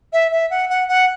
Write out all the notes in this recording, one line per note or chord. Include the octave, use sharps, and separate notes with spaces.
E5
E5
F#5
F#5
F#5